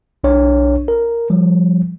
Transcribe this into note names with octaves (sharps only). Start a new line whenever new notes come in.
B1 D4 C#5
A#4
F3 G3